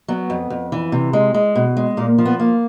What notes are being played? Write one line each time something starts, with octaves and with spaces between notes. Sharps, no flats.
F#3 B3
F2
F2
E3
C3
G#3
G#3
B2
G#3
A#2 A#3
F3
B3
A#3